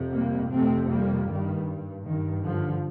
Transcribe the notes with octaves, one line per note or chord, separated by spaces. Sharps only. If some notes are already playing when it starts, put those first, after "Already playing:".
Already playing: F2 C3
G3 A#3
F2 C3 A3 C4
G3 A#3
G2 D#3 G3
G2 D#3
D3 F3